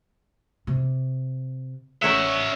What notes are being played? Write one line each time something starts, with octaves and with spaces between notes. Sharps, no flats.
C3
A1 C#4 A#4 C#5 E5 F#5